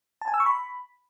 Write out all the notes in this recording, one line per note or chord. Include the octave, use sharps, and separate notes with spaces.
A5
G#5
E6
C#6
B5